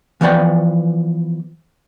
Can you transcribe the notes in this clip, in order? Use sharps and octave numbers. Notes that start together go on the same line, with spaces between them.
E3 F3 B3 B4 D5 G5